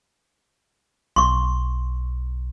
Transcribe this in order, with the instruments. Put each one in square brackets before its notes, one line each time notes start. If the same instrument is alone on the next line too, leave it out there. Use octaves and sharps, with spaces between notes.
[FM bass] B1 [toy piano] C6 C#6